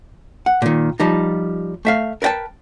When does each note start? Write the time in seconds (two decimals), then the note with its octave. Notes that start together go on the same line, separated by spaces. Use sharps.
0.46 F#5
0.62 A#2 D#3
1.00 F3 G3 D#4
1.85 A3 E5 F5
2.22 A#4 B4 D5 G5 A5